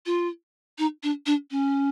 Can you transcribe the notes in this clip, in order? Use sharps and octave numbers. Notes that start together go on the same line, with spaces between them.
F4
D#4
D4
D4
C#4